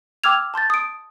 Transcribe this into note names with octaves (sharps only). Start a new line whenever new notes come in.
G5 D6 E6 F6 G#6 F7
A5 C6 G6 A6
D#6 D7